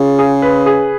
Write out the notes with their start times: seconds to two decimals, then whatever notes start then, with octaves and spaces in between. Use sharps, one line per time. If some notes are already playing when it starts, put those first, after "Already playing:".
Already playing: C#3 F4
0.19 G#4
0.42 B4
0.66 G#4